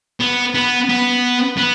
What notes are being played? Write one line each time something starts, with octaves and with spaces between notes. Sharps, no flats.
B3
B3
B3
B3